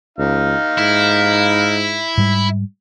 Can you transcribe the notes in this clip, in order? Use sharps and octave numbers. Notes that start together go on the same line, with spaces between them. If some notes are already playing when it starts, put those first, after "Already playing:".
C#2 D#4 F5
G#2 E4
G#2 G3